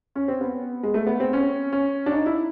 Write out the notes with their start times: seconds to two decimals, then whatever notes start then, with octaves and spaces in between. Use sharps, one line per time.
0.15 C#4
0.28 C4
0.41 B3
0.83 G#3
0.94 A3
1.07 B3
1.20 C4
1.33 C#4
1.73 C#4
2.06 D4
2.12 D#4
2.26 E4